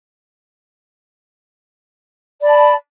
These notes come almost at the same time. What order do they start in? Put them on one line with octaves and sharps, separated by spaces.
D5 B5 A5